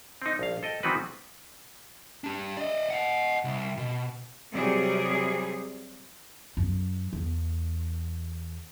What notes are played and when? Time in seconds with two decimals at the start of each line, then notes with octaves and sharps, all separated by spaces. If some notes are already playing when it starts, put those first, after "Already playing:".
0.22 C4 D#4
0.39 A#1 F5
0.63 A4 D#5 G5
0.83 D#3 E3 B3 C4 F#4 B4
2.24 D4 G4
2.57 D5 D#5
2.90 D#5 F#5
3.44 C2
3.77 B2
4.51 C3 F#3 G3 G#4
6.57 F#2
7.13 E2